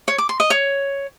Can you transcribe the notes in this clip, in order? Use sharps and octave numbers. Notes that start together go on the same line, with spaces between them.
C#5
D6
C6
D#5
C#5